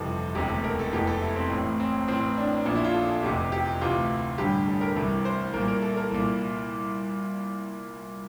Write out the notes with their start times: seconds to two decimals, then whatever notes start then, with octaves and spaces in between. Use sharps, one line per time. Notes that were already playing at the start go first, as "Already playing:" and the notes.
Already playing: G1 F2 C3 E3 A4
0.35 E1 D2 C3 E3 G4
0.50 A4
0.64 A#4
0.79 A4
0.92 F1 E2 E3 G4
1.07 A4
1.22 E4
1.36 C4
1.50 A1 A2 E3
1.80 C4
2.08 A1 A2 E3 C4
2.38 D4
2.65 A#1 A#2 D4
2.75 E4
2.85 F4
2.94 A4
3.23 F1 E2 C3 G4
3.52 G4
3.81 D2 C3 E3 F4
4.38 A1 G2 D3 G4
4.67 A4
4.81 A#4
4.96 C2 C3 E3
5.25 C5
5.54 C2 A#2 A#4
5.68 A#4
5.82 A4
5.97 A#4
6.11 C2 A#2